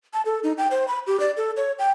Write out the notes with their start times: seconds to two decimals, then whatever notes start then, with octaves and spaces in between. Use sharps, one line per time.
0.13 A5
0.25 A4
0.44 D#4
0.58 G5
0.71 C5
0.88 B5
1.07 G4
1.20 D5
1.37 A4
1.57 C#5
1.79 G5